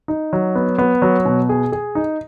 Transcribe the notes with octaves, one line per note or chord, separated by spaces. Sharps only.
D#4
F#3
B3
B3
F#3
B2
G#4
G#4
D#4